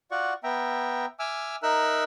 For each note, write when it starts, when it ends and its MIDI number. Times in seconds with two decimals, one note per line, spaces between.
0.11 0.33 65
0.11 0.33 66
0.11 0.33 74
0.11 0.33 78
0.11 0.33 85
0.44 1.06 59
0.44 1.06 76
0.44 1.06 79
0.44 1.06 82
1.19 1.56 76
1.19 1.56 80
1.19 1.56 86
1.19 1.56 88
1.19 1.56 89
1.63 2.04 63
1.63 2.04 70
1.63 2.04 76
1.63 2.04 88
1.63 2.04 90